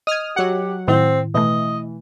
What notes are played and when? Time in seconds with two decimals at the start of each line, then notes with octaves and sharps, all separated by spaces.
0.07 D#5 D#6 F6 G#6
0.36 F#3 G4 F#5
0.88 A2 D#3 C4 E4
1.35 B2 E3 A3 D#5